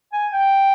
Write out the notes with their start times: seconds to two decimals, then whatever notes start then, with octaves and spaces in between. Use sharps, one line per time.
0.13 G#5
0.32 G5